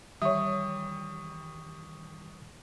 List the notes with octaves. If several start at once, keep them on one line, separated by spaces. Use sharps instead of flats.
D#3 E3 G3 C#5 E5 C#6 D#6